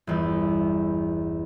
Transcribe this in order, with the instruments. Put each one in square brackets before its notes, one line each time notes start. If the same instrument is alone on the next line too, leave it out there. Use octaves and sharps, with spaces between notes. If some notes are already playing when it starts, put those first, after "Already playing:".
[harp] G1 E2